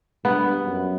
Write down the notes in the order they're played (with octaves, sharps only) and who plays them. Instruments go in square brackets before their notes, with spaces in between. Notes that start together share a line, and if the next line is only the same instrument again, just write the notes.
[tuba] G2 [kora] B3
[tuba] F#2